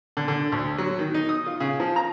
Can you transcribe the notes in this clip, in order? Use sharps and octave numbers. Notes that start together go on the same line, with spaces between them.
D3
D3
D2
F#3
D#3
D#4
D#6
F4
C#3
F3
A#5